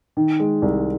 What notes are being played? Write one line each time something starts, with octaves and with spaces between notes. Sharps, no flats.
D#3
G#3
C2